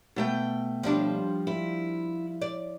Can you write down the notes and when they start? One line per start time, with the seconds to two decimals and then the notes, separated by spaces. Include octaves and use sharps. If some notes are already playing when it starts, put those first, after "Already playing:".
0.16 B2 A3 G5
0.83 F3 G3 D4
1.47 E4
2.42 D5